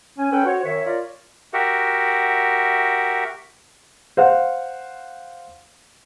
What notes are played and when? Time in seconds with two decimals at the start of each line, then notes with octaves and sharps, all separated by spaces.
0.18 C#4 G#5
0.32 C#4 A4 B4 G5
0.45 F#4 C5 C#5
0.64 F#2 D#3 C#5 E5
0.85 F4 A#4 D5
1.53 F#4 G4 A#4 E5 F#5
4.17 C5 F5 F#5